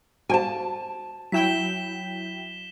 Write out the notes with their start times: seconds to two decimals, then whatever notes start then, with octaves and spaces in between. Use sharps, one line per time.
0.30 F#4 C5 F5 G#5 A5
1.32 F#3 E4 G5 B6 E7 G7